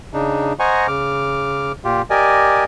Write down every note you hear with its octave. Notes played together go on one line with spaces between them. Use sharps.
C#3 D4 D#4
C5 D#5 F#5 G#5 A#5 C#6
C#3 D6 F6
A#2 F4 G4
G4 A#4 D5 D#5 G#5